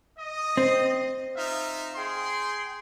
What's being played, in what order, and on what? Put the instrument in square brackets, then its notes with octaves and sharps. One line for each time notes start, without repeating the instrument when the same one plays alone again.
[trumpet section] D#5
[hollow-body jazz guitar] C4
[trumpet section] D#4 F4 E5
G#4 G5 C6